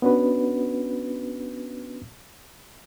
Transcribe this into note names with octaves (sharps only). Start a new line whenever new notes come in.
B3 C#4 D4 F#4 B4